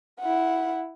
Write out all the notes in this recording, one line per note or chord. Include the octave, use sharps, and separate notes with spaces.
E4 F#5